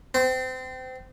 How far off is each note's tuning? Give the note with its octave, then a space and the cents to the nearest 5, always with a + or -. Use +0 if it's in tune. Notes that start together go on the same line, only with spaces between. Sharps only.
C4 -25